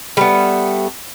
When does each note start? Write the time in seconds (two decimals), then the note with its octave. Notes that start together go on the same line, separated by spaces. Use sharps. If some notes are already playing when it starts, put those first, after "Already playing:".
0.17 G3 A3 B3